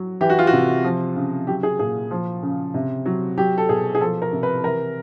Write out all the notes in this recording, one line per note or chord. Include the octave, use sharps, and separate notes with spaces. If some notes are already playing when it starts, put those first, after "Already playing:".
Already playing: F#3
E3 G4
F#4
F4
F#4
C3
F3
C#3
F#3 G4
G#4
A#2 G#4
F3
C#3
C3
F#3
F#3 G4
A4
B2 G#4
G#4
F3 A4
A#4
C3
B4
E3 A#4